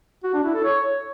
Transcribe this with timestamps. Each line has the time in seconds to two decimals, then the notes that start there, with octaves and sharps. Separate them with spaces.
0.24 F#4
0.34 D4
0.44 E4
0.54 A4
0.64 C#5